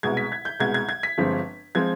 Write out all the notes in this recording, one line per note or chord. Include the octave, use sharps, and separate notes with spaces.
C2 B2 G#3 G#6
B6
G#6
G6
C2 B2 G#3 G#6
G#6
G#6
B6
G1 G2 F3 G#3 C4
F3 G#3 C4 G#6